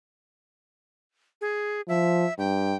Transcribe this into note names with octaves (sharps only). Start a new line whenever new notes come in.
G#4
F3 E5
G2 G5